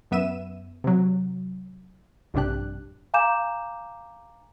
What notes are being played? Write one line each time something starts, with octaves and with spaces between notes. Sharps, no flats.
F#2 B3 E5 D#7 E7
C3 F#3
A#1 G2 C3 D4 G4 F#6
F5 G#5 A#5 D6 G6 E7